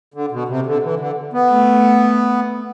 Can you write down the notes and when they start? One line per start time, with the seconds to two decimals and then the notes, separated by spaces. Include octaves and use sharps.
0.14 D3
0.32 B2
0.48 C3
0.66 D3
0.83 E3
1.00 D3
1.33 B3
1.51 A3